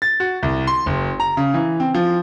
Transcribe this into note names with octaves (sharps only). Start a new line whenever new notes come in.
A6
F#4
C2
C6
F#1
A#5
C#3
E3
C4
F3